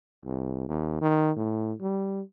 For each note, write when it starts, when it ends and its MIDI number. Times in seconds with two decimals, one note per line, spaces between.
0.25 0.67 36
0.68 0.98 39
1.01 1.31 51
1.36 1.73 45
1.81 2.21 55